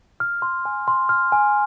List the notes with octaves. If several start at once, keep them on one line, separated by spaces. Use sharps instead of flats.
F6
C6
G#5
C6
F6
G#5